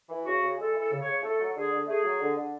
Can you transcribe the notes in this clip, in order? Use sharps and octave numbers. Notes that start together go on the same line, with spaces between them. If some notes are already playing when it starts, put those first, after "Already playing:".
E3
C#3 F#4
C#3
G#3 A4
E3
A4
C#3
C#5
C#3
A3 A4
F#3
D3 G#4
D3
A3 G#4
F#3
D3
D3